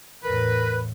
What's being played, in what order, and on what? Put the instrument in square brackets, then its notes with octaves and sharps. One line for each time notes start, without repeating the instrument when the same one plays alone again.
[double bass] E2 A2 [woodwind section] A#4 B4